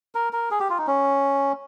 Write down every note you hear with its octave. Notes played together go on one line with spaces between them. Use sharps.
A#4
A#4
G#4
G4
F4
D#4
C#4